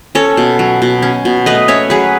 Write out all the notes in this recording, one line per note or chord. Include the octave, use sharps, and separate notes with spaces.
C#4 A4 C#5
B2
F#3
B2
C#4
B2
A3 B4 D#5
C#4 C#5 E5
F#3 G#4 B4